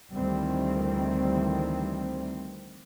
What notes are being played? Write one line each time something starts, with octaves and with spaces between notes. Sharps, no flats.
D2 D#3 E3 G3 C4